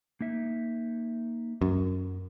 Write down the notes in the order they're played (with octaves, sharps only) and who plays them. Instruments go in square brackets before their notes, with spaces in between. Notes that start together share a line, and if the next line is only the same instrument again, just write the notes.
[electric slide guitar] A#3 D#4 E5
[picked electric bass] F#2